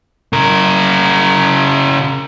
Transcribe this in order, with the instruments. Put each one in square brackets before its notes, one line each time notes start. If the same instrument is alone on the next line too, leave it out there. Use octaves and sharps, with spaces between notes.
[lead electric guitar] C#3 A#4